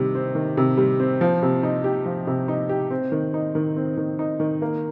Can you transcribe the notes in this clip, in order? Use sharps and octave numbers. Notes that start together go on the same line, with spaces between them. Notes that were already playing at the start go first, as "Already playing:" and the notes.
Already playing: C3 D#3 G3
C4
D#3
C3
G3
C4
F3
C3
D#4
G4
F3
C3
D#4
G4
C4
D#3
D#4
D#3
C4
D#3
D#4
D#3
A#3